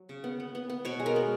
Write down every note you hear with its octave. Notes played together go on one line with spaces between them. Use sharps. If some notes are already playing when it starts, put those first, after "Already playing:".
Already playing: F#3
C#3
B3
B3
B3
B3
B2 C#5
G#3
A#4
B3